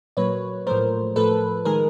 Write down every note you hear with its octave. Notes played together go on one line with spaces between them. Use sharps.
A#2 F#3 A#3 B4 C#5
A2 F3 A3 A#4 C5
A2 F3 A3 A4 B4
D#3 G#3 G#4 A#4